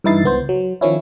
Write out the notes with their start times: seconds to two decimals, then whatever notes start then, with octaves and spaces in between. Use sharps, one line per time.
0.04 G2 E3 D#4 E4 A6 C7
0.24 C#2 B3 C5
0.49 F#3
0.81 D#3 F3 C#4 E4